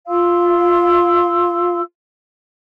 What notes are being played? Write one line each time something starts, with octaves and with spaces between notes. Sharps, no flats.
F4 F5 C6 E6